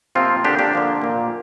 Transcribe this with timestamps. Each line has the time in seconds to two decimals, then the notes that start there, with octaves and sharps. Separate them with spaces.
0.15 C3 F3 A#3 C4 F4
0.44 D3 F3 A#3 D4 G4
0.59 D4 G4
0.74 D3 F3 A#3
1.02 A#2 A#3